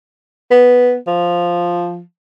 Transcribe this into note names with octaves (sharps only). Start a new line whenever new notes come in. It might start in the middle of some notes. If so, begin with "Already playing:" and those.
B3
F3